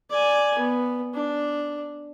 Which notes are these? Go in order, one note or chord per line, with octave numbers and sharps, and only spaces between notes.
D5 G#5
B3
D4